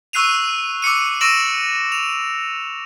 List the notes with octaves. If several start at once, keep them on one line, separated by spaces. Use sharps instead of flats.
C#6 E6 F#6 C7 D#7 F7
D6 E6 C#7 D#7
C#6 E6 A#6 D7 E7 F#7
F7